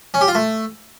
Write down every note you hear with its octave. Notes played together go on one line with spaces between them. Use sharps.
C#4
G4
F4
A3